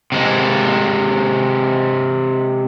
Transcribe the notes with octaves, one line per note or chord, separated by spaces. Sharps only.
C3 G#3